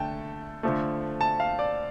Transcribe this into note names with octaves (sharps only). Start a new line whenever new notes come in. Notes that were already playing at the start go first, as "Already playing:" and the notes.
Already playing: D3 A3 G5 A5
D3 F3 A3
A5
F5
D5